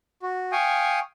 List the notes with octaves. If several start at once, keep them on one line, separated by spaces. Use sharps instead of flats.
F#4
F5 G5 G#5 C#6 D#6